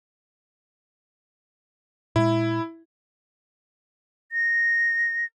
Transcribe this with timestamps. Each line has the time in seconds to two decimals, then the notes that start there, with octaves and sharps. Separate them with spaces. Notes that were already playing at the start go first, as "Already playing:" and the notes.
2.16 A#2 G#3 E4
4.32 A#6